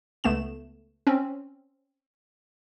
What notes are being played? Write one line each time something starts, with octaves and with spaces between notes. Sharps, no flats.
C#2 A3 B3 E7
C4 C#4